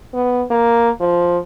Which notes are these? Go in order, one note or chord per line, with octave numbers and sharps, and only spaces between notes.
B3
A#3
F3